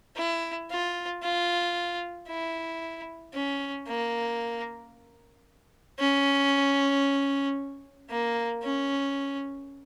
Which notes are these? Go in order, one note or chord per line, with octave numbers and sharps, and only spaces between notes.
E4
F4
F4
E4
C#4
A#3
C#4
A#3
C#4